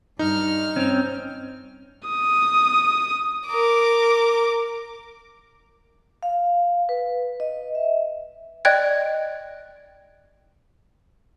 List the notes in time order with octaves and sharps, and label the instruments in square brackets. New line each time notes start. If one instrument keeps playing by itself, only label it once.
[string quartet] G2 F6 [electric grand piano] D#4
[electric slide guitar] C4 C#4
[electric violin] D#6
[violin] A#4 D6
[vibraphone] F5
B4
D#5
E5
[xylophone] D5 D#5 G5 F#6 G#6